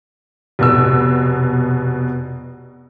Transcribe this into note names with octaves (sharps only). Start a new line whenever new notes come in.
F1 B2 E6